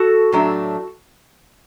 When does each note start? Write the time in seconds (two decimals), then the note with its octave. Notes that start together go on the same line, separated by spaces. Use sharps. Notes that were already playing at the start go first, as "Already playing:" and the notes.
Already playing: F#4 A4
0.32 A2 F#3 A3 D4